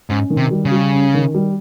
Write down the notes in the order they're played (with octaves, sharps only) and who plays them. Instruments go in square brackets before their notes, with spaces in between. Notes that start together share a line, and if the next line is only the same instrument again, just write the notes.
[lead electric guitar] G#2 [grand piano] C#4
[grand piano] D#3
[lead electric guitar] C3
[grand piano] G3
[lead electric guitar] C#3
[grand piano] G3
C#4
D#3
G3